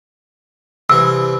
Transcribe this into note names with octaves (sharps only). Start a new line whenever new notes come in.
C2 E3 E6